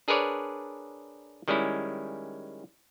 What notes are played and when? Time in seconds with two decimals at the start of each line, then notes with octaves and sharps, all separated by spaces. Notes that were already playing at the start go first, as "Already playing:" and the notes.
0.08 D4 G#4 A#4 B4 C#5 D5
1.48 D#3 G3 G#3 C#4 E4